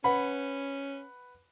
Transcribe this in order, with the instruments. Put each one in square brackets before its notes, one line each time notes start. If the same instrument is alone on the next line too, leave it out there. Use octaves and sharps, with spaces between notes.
[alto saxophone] C#4 [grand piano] B4 F#5 B5